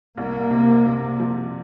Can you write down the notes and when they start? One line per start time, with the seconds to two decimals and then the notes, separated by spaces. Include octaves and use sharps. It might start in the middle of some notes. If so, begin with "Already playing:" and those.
0.17 C2 A#3
0.51 C3
0.86 C3
1.20 F3